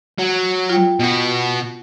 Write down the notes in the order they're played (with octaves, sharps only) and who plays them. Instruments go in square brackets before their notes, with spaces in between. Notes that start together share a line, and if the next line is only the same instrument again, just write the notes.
[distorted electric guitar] F#3
[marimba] F4 G5
[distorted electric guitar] B2 F#4